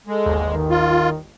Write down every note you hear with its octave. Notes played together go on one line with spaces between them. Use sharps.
G#3 A4
G1 D#2
D#3
F4